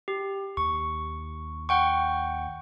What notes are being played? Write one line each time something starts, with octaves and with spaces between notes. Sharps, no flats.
G4
D#2 C#6
F#5 G5 C#6